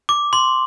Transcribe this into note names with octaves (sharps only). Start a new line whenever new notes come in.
D6
C6